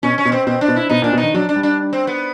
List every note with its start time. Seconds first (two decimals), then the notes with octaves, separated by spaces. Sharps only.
0.03 B2 C#4
0.18 C#4
0.25 B2
0.32 C4
0.47 B2 C4
0.61 D4
0.68 B2
0.76 E4
0.89 B2 D#4
1.02 A#2 D4
1.13 B2
1.18 D#4
1.23 D#3
1.34 F#3 D4
1.49 D4
1.56 G3
1.63 D4
1.93 C4
2.07 B3